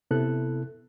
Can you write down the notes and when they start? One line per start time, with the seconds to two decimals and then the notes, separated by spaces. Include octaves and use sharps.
0.11 C3 B3 E4 A4 F#6